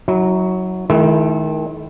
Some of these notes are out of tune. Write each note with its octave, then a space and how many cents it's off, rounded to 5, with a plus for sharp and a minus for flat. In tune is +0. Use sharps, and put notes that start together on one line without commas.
F#3 +0 E4 -40
D#3 +10 A3 -45 E4 +15